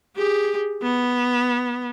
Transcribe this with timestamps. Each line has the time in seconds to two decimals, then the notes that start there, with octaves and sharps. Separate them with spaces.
0.17 G4 G#4
0.82 B3